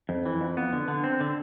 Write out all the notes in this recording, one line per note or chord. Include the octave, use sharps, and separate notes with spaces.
F2
E3
F2
B3
D3
D3
C4
D3